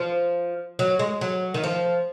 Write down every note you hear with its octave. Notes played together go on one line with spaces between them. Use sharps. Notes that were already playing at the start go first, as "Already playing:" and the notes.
Already playing: F3
F#3
G#3
F#3
D#3
F3